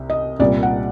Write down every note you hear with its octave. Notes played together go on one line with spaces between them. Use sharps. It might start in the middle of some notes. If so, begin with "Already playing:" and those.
Already playing: C2 C3
D#5
C2 A#2 G3 D5
F#5